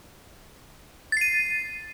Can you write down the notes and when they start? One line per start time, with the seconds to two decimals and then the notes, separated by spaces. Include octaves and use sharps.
1.12 A6
1.17 C7
1.21 D#7